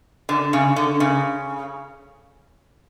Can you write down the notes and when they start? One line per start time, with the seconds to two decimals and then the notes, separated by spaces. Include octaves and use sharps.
0.29 D3
0.53 C#3
0.76 D3
1.00 C#3